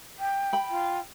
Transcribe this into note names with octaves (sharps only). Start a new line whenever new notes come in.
G5
G5 B5
F4